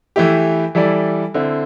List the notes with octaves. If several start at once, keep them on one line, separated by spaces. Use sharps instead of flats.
E3 A3 E4 G4
E3 G3 E4 A4 D5
D3 C4 E4